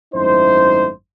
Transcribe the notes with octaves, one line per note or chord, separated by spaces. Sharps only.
G#1 F#2 A3 D#4 E4 C5